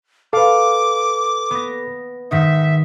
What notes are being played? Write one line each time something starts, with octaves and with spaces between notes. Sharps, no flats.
A4 B4 F5 D6
B3 A#6
G#2 D#3 D#4 E5